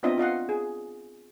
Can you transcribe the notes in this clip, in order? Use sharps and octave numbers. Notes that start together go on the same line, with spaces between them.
B3 C4 D4 F4 D#5 E5
F4 D#5 F5 F#5
G#4